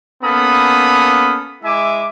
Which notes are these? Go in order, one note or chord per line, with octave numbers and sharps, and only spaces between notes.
A#3 B3 C#4 A4 B5 D#6
G#3 E4 E5 G#5 D6